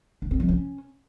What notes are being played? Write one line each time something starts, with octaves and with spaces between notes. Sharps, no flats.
D4
C4
F3
C#4